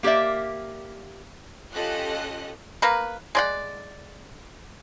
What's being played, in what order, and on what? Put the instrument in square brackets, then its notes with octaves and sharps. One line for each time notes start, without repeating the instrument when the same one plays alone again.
[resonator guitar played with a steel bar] A#3 G4 A#4 D5 E5
[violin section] C#4 F4 G4 A4 D#5 F#6
[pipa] A#3 A#4 B4
G#3 D5 F#5